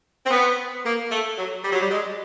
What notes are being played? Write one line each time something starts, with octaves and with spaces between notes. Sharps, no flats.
C4
B3
A#3
A3
F#3
G3
F#3
G3
G#3